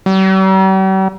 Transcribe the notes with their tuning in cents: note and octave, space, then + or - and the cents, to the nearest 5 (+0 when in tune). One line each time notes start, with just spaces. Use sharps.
G3 -45